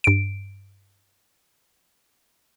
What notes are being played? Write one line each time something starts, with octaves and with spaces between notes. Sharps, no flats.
G2 D7